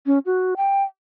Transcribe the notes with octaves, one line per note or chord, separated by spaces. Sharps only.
C#4
F#4
G5